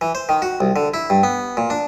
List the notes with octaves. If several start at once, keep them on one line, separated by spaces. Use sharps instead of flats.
E3
C5
D#3
F#4
C2
D3
E4
G2
B3
A#2
D4